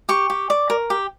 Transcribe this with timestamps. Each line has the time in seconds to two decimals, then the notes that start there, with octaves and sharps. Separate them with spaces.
0.09 G4 C#6
0.30 G4
0.50 D5
0.70 A#4
0.90 G4